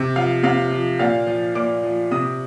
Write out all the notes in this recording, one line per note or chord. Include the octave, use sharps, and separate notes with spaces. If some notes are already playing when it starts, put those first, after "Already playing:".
Already playing: C3
F3 F5
C3 F5
F3
A#2 F5
F3
A#2 D6
F3
C3 D#6